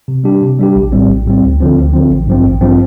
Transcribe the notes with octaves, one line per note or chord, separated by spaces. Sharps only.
C3
G3 D4 G4
C3
G3 D4 G4
A#1
A2 G3 C4
A#1
A2 G3 C4
D2
D3 F3 C4
D2
D3 F3 C4
A1
G2 F3 C4
A1
G2 F3 C4